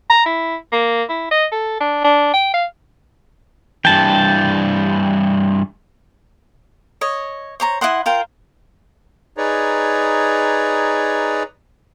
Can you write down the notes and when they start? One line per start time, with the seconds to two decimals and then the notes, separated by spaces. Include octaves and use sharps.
0.10 A#5
0.26 E4
0.72 A#3
1.09 E4
1.31 D#5
1.51 A4
1.80 D4
2.04 D4
2.33 G5
2.54 F5
3.85 G2 E3 G5 A5
7.01 C#5 D#5
7.60 C5 C#5 A#5
7.81 E4 D#5 F#5 C6
8.06 F4 A#4 C5 G5
9.37 D#4 G#4 B4 C#5 D5 A#5